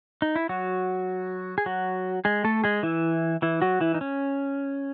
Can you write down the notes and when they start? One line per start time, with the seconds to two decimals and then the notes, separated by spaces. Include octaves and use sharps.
0.22 D#4
0.36 E4
0.49 F#3 F#4
1.58 G#4
1.66 F#3 F#4
2.25 G#3 G#4
2.44 A3 A4
2.64 G#3 G#4
2.83 E3 E4
3.42 E3 E4
3.62 F#3 F#4
3.81 E3 E4
3.94 D#4
4.01 C#4